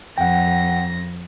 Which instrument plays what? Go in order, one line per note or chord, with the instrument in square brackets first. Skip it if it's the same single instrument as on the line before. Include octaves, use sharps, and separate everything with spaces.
[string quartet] F2 A#6 [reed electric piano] F#5 G5